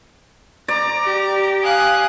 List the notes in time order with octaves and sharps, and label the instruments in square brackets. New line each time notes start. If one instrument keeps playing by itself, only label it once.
[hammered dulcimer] D5 [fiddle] A#5
[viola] G4
[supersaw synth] F5 G#5 [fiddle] D#6 F#6